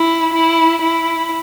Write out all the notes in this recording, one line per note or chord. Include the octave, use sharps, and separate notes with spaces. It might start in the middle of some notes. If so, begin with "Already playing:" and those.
Already playing: E4
E4
E4